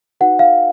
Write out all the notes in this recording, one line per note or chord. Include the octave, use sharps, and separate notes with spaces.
D#4 F#4 B4 F#5
F5